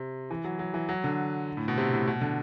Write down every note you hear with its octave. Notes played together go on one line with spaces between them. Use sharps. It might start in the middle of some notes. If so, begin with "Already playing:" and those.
Already playing: C3
E3
F#3
F#3
E3
F#3
D3
A2
B2
C3
A2
B2
D3